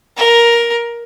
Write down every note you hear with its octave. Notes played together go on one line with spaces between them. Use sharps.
A#4